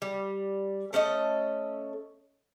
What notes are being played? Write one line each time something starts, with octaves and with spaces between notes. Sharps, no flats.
G3
A3 C#4 A4 D#5